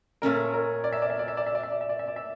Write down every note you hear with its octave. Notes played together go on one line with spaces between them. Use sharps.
A#2 A3 C#4 A#4
A#4
D5
E5
D5
E5
D5
E5
D5
E5
D5
E5
D5
E5
D5
E5
D5
E5